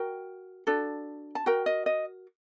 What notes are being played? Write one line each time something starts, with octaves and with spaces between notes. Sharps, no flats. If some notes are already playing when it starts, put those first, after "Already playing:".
Already playing: F#4 A#4 G5
D4 F#4 A4
A5
F#4 A#4 G5
D#5
D#5